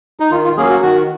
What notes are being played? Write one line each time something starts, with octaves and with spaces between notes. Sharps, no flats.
D#4
D#3 F4
F4
F#3 A#3 C#4 G#4
F#4
D#3 F#4